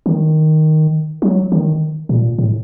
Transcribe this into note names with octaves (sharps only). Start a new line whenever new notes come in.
D#3
F#3
D#3
A#2
A2